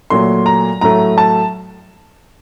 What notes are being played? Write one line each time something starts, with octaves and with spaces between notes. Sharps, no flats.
A#2 F#3 A3 C6
A#5
A2 F#3 A3 A#5
A5